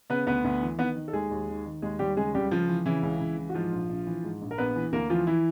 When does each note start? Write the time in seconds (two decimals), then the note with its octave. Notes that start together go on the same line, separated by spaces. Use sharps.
0.10 C#3 B3 B4
0.27 D2 B3 B4
0.44 D2
0.61 E3
0.78 D#3 B3 B4
0.96 D#3
1.08 A4
1.13 D#2 G#3 G#4
1.31 D#2
1.48 D#3
1.66 D#3
1.82 D#2 G#3 G#4
1.99 D#2 G3 G4
2.16 C#3 G#3 G#4
2.34 C#2 G3 G4
2.51 C#2 F3 F4
2.68 E3
2.86 C#3 E3 E4
3.03 C#2
3.21 C#2
3.37 E3
3.49 F#4
3.54 G#2 F3 F4
3.72 A#1
3.89 A#1
4.07 E3
4.24 G#2
4.41 A#1
4.51 A#4
4.58 A#1 B3 B4
4.76 E3
4.92 D2 A#3 A#4
5.10 E3 F3 F4
5.27 E3 E4